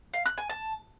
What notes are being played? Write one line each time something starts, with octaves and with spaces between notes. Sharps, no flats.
F5
F#6
G#5
A5